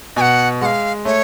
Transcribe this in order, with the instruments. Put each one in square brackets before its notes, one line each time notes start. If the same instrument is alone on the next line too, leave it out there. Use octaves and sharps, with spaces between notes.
[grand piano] B2 [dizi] G#5
[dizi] F#5
[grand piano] G#3 [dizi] F5 F#5
[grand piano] A3 [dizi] C#5